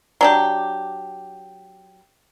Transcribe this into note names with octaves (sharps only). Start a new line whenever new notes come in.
F#3 D4 G4